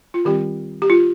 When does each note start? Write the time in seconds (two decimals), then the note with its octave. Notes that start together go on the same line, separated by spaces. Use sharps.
0.14 F4
0.25 D#3 G3 C4 G4
0.82 G4
0.90 F4